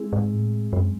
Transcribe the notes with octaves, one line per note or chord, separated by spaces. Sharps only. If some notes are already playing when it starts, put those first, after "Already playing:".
Already playing: G#3 C4 E4 G#4
G#2
A2
F#2 G#3 C4 E4